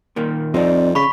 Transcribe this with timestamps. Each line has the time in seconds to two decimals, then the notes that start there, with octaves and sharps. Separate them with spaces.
0.16 A#2 D#3 A#3
0.54 F2 F3 C4 D#4 D5
0.95 C#3 B5 C#6 B6